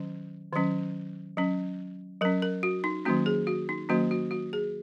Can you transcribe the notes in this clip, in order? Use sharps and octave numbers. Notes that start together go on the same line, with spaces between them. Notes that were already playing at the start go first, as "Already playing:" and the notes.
Already playing: D#3 F#3 C#4
D#3 F#3 C#4
F#3 C#4
F#3 C#4 A#4
A#4
F#4
D#4
D#3 F#3 A#3 C#4 F#4
G#4
F#4
D#4
D#3 F#3 A#3 C#4 F#4
F#4
F#4
G#4